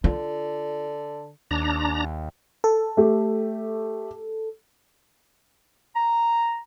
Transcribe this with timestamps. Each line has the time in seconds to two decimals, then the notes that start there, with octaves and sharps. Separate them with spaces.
0.04 D3 F4
1.51 D#2 D4 A#5
2.64 A4
2.97 A3 G4
5.95 A#5